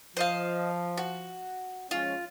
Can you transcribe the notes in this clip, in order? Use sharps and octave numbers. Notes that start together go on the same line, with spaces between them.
F3 C5 D#5 F5
F#4
F3 G#3 C#4 F4